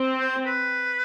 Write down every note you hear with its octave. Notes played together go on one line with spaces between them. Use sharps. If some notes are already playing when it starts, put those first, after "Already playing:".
Already playing: C4
C5
B4